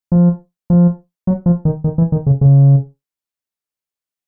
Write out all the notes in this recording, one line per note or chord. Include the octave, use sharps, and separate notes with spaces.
F3
F3
F#3
F3
D#3
D#3
E3
D#3
C#3
C#3